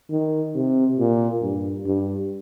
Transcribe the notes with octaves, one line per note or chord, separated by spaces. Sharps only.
D#3
C3
A#2
G2
G2